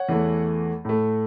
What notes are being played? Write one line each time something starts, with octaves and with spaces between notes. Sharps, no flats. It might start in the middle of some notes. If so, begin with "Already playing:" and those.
Already playing: C#5 F#5
E2 E3 A3
A2 A3